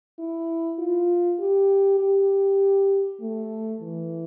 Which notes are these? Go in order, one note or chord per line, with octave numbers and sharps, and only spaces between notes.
E4
F4
G4
G4
A3
E3